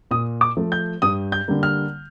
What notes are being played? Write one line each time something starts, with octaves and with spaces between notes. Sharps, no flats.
A#2 D#6
D6
F3 A3
G6
G2 D#6
G6
D3 G3 A#3
F6